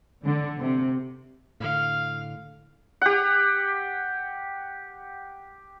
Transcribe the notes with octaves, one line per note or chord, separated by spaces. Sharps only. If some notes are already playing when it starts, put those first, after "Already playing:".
D3
C3
A2 D3 F5
G4 F#5